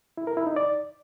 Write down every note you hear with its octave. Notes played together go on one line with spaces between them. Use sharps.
E4
A#4
E4
D#4
D5